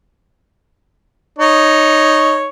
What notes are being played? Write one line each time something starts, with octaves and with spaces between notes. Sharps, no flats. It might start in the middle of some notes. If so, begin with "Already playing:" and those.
D#4 C#5